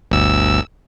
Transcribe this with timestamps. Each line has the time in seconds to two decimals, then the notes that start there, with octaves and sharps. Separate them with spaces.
0.11 G1 D2 E6